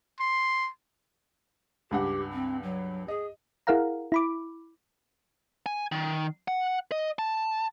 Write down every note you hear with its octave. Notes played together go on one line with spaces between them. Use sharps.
C6
C#2 G2 G4 F#5
C4
F#3
G#4 D#5
E4 G#4 A#4 F5 F#5 A#5
E4 B5 D6
G#5
D#3
F#5
D#5
A5